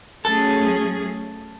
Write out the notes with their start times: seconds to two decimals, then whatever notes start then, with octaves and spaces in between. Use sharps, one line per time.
0.25 F#3 A3 C#4 G#4 A4